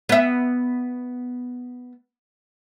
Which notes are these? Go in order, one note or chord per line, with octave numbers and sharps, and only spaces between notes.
B3 E5